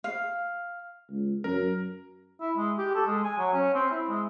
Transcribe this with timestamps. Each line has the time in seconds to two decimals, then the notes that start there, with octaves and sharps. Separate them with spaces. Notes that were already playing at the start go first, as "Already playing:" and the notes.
0.04 F5
1.09 C#2
1.44 F#2 A#4
2.41 E4
2.57 G#3
2.78 G4
2.95 A4
3.07 G#3
3.24 G#5
3.38 F#3
3.53 C#4
3.74 C4
3.91 E4
4.08 G#3